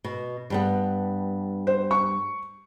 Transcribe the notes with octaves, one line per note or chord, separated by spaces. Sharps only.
B2
G2 G3 B3
C5
C#6